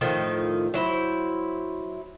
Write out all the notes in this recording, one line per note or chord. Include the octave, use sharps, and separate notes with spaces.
A2 D#3 F3 D#4
F#3 E4 C5